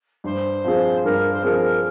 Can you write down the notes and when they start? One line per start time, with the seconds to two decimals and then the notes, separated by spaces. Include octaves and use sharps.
0.24 G2 C5
0.65 F3 C4 F4 G#4
1.04 G2 A#4
1.33 C5
1.43 F3 C4 F4 G#4 A#4